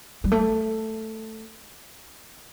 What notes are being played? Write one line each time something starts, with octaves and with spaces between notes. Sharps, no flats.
G3
A3